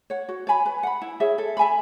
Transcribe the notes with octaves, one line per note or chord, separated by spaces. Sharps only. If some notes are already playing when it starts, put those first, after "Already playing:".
C#5 F#5
F#4
C#5 G#5 B5
B4
F#5 B5
E4
G#4 C#5 E5
A4
E5 G#5 B5